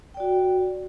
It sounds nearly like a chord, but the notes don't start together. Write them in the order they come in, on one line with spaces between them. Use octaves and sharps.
G5 D5 F#4